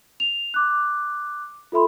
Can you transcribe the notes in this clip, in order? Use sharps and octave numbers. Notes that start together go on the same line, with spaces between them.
F7
D6 F#6
F4 A4 E5 B5 C6